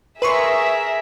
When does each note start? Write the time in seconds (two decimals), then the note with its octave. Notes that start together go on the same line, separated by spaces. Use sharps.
0.22 G#4 A#4 B4 E5 C6 C#6